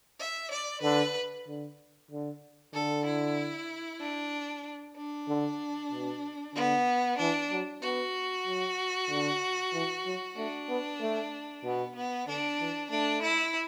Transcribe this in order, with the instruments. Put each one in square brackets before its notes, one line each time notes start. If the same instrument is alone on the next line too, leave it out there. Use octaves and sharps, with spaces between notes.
[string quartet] E5
D5
[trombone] D3 [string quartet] B4
[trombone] D3
D3
[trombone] D3 [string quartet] A4
[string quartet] E4
D4
D4
[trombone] D3
B2
[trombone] D3 [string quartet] B3
[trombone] E3 [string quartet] D4
[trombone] F#3
[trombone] B3 [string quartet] F#4
[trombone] F#3
D3
E3
F#3
[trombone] A3 [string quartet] D4
[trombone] B3
A3
[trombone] B2 [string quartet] B3
[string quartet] B3
[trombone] D3 [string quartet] D4
[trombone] E3
[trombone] A3 [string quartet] D4
[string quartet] E4